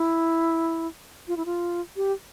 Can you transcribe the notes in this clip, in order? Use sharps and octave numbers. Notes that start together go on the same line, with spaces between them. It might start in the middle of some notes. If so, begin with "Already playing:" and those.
Already playing: E4
F4
E4
F4
G4